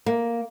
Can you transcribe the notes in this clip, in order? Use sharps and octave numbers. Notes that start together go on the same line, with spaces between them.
A#3